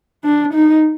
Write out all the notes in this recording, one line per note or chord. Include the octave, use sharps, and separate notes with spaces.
D4
D#4